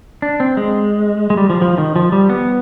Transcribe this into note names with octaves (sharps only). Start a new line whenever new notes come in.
D4
C4
G#3
G#3
G3
F3
F3
D#3
F3
G3
B3